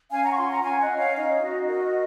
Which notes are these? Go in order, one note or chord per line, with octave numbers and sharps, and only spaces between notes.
C#4 F5 G#5
F#5 A#5
C#6
F4 G#5 C6
F#5 A#5
C#4 F5 G#5
D#5 F#5
C#4
C#5 F5
D#4 D#5
F#4
A#4 D#5